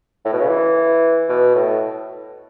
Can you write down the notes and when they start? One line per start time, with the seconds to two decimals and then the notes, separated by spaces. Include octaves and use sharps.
0.25 A2
0.32 B2
0.41 C#3
0.48 E3
1.29 B2
1.55 A2